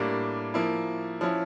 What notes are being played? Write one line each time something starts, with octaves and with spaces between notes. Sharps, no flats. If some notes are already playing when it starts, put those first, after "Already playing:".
Already playing: A2 G3 A#3 D4
F3 A#3 E4
F3 C#4 E4